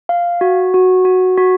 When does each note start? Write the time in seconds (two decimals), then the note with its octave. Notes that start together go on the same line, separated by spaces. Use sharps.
0.09 F5
0.41 F#4
0.74 F#4
1.05 F#4
1.37 F#4